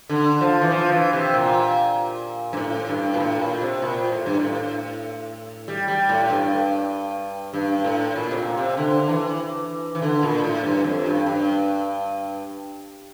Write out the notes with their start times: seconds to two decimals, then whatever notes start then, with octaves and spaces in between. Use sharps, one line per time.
0.09 D3
0.41 F3
0.62 E3
0.72 F3
0.92 E3
1.13 C3
1.34 A#2
2.53 G2
2.57 A2
2.89 G2
3.14 A#2
3.20 A2
3.40 A#2
3.61 C3
3.82 A#2
4.12 A2
4.26 G2
4.39 A2
5.68 G3
5.88 G3
6.09 A2
6.30 G2
7.54 G2
7.84 A2
8.16 A#2
8.31 C3
8.37 A#2
8.57 C3
8.77 D3
9.09 E3
9.95 E3
10.02 D3
10.23 A#2
10.44 A2
10.64 G2
10.84 F2
11.06 G2
11.26 G2